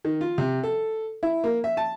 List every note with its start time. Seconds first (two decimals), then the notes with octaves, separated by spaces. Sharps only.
0.05 D#3
0.21 F4
0.38 C3
0.63 A4
1.23 E4
1.44 A#3
1.64 E5
1.77 A5